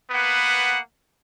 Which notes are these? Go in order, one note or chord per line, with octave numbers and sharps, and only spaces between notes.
A#3 B3 B4 F#5